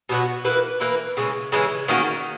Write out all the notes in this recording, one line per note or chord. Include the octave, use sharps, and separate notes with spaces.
B2 F#3 B3 F#4
E3 A#3 E4 B4
E3 A#3 E4 B4
C#3 E3 G#3
C#3 E3 G#3
D#3 A#3 C#4 F#4